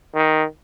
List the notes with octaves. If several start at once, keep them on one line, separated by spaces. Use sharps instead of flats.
D#3